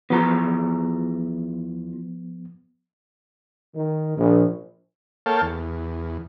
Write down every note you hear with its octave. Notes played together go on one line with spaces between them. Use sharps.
E2 F3 B3 F4 A#5
D#3
A#1
A#3 A4 C#5 F5 G5 A5
E2